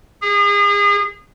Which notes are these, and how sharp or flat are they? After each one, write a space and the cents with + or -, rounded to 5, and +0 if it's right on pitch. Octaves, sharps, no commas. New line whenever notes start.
G#4 -35